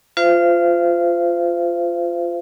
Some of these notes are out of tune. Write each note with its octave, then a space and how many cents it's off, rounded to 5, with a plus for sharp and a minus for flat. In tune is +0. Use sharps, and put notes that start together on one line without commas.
F4 +0 C5 -30 F5 -40